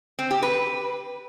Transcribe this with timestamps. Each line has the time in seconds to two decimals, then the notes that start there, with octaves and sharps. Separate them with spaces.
0.19 C4
0.31 G4
0.42 B4